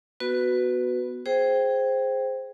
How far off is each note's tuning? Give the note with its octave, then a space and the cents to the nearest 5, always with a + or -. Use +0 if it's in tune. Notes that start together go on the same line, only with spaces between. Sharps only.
B3 +0 F#4 +0 B4 +10
G#4 +0 C5 +0 G5 +0